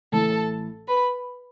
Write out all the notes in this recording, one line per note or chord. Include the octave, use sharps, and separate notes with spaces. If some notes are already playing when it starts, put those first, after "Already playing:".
A1 A2 E3 A3 E4 A4 A5
B4 B5